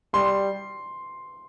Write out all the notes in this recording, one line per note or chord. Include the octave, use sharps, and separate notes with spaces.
G3 C6